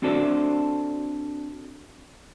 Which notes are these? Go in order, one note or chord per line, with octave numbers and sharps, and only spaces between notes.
C4 D4 F#4 A4 C5 D5